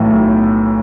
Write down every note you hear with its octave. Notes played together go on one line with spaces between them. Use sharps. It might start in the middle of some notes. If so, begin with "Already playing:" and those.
Already playing: B1 A2 E3 A3
B1